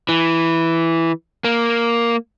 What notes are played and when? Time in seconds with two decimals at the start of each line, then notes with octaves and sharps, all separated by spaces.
0.09 E3
1.44 A#3